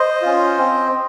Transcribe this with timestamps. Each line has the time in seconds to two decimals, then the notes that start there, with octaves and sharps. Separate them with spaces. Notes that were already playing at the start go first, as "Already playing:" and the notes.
Already playing: C5 D#5
0.22 C#4 F4
0.58 C4